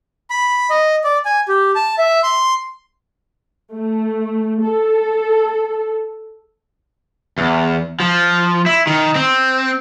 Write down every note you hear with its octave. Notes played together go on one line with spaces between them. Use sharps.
B5
D#5
D5
G#5
G4
A5
E5
C6
A3
A4
E2
F3
E4
D#3
C4